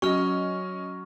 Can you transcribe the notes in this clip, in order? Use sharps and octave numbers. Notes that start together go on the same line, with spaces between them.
F#3 C#4 D#5 C#6 F6